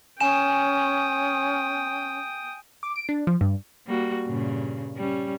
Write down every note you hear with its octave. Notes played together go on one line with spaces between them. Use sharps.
C#4 G5 G#5 D#6 E7
D6
D7
D4
F3
G2
G3 A#3 F#4
G2 A#2 C#3
G3 C#4